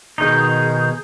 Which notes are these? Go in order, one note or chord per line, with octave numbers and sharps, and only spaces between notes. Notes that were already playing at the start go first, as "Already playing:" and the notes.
B2 D#3 D#4 G#4 G6